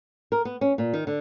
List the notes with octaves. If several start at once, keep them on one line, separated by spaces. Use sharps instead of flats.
A#4
B3
C#4
A#2
D#3
D3